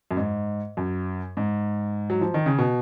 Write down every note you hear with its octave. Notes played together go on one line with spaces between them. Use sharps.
F#2
G#2
F#2
G#2
F#3
F3
D#3
C#3
B2